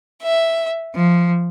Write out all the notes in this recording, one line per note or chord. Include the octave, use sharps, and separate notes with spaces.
E5
F3